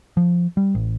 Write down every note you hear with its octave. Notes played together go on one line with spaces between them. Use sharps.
F3
G3
A1